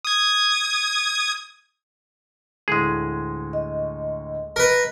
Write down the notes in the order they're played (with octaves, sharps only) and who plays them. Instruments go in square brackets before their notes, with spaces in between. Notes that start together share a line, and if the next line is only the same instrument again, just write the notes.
[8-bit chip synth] D#6 G#6
[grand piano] D2 A2 [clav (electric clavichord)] G#3 G#4
[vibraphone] D#5
[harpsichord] A#4 B4